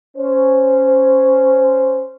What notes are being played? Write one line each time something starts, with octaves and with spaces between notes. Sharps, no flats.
C#4 C5